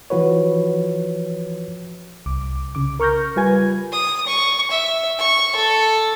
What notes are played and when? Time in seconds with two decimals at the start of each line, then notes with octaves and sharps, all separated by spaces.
0.10 E3 F3 F#4 B4 C#5
2.26 C2 D6
2.75 C#3 D6
3.00 A#4 C#6 F6 G6 A#6
3.36 G3 F4 B4 G#5 G#6
3.92 D#6
4.27 C#6
4.71 E5
5.19 C#6
5.56 A4